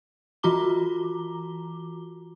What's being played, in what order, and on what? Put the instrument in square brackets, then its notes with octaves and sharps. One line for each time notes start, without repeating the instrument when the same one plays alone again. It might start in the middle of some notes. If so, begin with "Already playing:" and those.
[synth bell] E3 F4 F#4 A#5 D6 G7